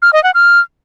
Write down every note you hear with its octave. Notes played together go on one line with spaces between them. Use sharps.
F6
D#5
F#5
F6